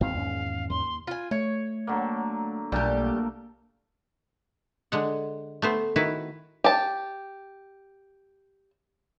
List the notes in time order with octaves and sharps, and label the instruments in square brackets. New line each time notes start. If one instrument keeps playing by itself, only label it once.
[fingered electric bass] G#1 E2 C4 [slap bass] D#3 G#3 A#3 [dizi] F5
[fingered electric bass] E2 G#2 C#4
[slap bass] D#2 [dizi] C6
[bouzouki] F4 G#5
[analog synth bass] A3 [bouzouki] C#5
[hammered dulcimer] D3 F#3 A#3
[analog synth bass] B1 [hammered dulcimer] A#2 A3 A#3 [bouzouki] G3 G4
[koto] D3 G#3 F#5
A3 B3 C5
D#3 E4 F#4 B4
[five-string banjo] G4 A5